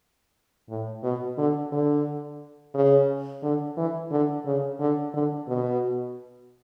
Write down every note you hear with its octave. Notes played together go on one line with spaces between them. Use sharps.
A2
B2
D3
D3
C#3
D3
E3
D3
C#3
D3
D3
B2